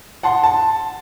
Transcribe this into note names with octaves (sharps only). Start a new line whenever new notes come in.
F#5 A5 C6
A5